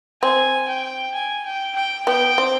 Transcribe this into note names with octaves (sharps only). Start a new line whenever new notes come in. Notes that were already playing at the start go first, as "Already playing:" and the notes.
C4 G#5
G5
G#5
G5
G5
B3 G5
C4